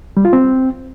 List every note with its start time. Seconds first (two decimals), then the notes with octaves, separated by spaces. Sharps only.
0.17 G3
0.25 F4
0.33 C4